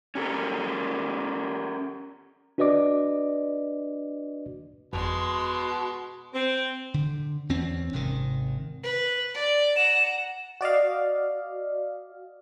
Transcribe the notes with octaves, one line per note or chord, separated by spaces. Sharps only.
C#4 G4 A4 A#4
D4 F#4 B4 D5 D#5 D6
G1 F2 B2 G#3 C6
C4
D3
E2 C4 C#4
G#1 C3 D#3
B4
D5
F#5 A#5 E7
F#4 D5 D#5 F5